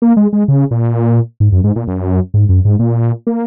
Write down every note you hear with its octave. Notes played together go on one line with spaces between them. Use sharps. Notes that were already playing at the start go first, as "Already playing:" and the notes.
A#3
G#3
G#3
C#3
A#2
G#2
F#2
G#2
A#2
F#2
G#2
F#2
G#2
A#2
A#3